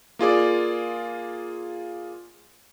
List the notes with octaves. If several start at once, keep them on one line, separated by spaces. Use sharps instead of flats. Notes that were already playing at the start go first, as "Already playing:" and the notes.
A#3 F4 G#4 D5